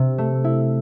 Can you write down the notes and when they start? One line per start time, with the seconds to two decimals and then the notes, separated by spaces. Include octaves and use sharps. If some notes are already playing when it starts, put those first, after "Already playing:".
Already playing: C3
0.18 A3
0.44 E4